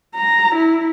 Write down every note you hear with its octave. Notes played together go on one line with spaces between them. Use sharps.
A#5
E4